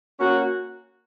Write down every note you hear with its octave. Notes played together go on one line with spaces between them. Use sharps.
A#3 C#4 F#4